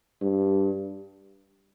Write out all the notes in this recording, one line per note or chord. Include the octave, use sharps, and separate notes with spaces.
G2